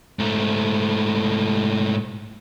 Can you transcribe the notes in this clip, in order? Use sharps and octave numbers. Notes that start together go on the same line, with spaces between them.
G#2 A3